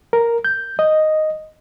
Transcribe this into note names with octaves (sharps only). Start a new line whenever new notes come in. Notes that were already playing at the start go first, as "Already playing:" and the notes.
A#4
G6
D#5